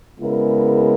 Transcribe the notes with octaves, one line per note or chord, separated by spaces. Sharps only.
C#3 G#3 B3 E4 A#4